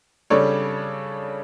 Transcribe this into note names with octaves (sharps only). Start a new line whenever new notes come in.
C#3 G3 D4 A4 C#5